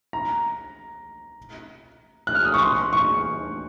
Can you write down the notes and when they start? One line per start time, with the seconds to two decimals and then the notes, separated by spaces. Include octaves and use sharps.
0.13 A#5
2.27 F#6
2.35 F6
2.45 D#6
2.54 C#6
2.63 C6
2.93 C#6